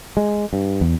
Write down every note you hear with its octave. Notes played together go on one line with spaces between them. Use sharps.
G#3
G2
E2